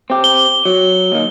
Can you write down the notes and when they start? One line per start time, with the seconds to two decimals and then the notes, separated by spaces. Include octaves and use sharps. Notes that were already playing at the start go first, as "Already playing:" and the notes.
0.10 C4 G4
0.24 G7
0.65 F#3
1.12 D#2 D#3